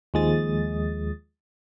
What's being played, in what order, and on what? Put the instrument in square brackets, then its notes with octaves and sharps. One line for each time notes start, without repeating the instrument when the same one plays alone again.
[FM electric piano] D#2 F3 G#3 D#6 A6